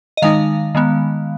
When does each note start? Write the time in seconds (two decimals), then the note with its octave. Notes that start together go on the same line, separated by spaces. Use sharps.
0.17 D#5
0.22 D#3 G#3 D#4 F5
0.75 D#3 G#3 B3